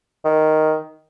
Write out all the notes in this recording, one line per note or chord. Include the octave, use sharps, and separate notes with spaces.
D#3